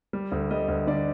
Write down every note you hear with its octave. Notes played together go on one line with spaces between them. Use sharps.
G3
D2
G3 D#5
D2
D3 D5